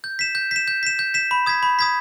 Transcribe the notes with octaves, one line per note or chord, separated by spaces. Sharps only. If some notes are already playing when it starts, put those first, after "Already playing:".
G6
B6 E7
G6
B6 E7
G6
B6 E7
G6
B6 E7
B5
D#6 G#6 B6
B5
D#6 G#6 B6